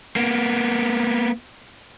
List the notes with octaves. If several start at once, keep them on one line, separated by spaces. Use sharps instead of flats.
A#3 B3